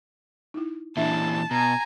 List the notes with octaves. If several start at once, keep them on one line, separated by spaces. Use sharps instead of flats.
D#4 E4
A#2 E3 D4 E5 A5
B2 G#5 A#5